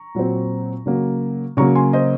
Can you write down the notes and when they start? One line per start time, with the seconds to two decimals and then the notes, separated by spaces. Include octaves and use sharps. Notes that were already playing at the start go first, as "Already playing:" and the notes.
Already playing: A#5 C#6
0.15 A#2 F#3 C4
0.86 C#3 F#3 A#3
1.57 C#3 F#3 A#3 A#5 C#6
1.75 G#5 C6
1.93 C5 D#5